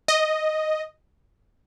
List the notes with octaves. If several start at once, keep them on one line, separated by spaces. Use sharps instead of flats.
D#5